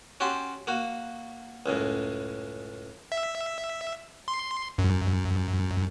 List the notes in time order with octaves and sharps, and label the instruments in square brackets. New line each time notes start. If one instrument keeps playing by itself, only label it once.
[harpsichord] C#4 F#4 G4 A5 C6
A#3 F#4
C#2 F#2 A2
[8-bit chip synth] E5
C6
F#2